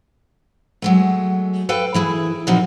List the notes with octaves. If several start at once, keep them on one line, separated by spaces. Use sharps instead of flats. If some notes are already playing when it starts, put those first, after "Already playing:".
F#3 G#3 A3
A4 B4 F5 G5
E3 E4 G#4
A#2 E3 F3 C4 D#4 F#4